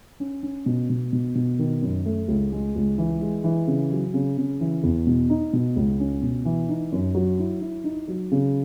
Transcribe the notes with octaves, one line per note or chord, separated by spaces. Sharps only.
C#4
C#4
B2
B2
B2
B2
D#3
F#2
A3
C#2
G#3
C#2
E3
G#3
E3
C#3
F#3
C#3
C#3
E3
E2
B2
D#4
B2
C#2
C#4
B2
E3
D#4
F#2
F#3
E4
E4
D#4
F#3
C#3